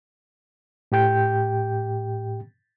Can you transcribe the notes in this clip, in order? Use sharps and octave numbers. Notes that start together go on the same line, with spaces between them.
A2 G4 G5 G6